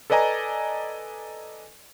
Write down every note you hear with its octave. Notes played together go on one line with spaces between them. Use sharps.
A4 B4 D5 D#5 G#5 A#5